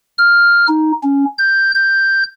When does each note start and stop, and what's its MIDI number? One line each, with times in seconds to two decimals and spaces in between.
0.18 0.66 89
0.68 0.92 63
1.03 1.25 61
1.38 1.72 91
1.75 2.24 91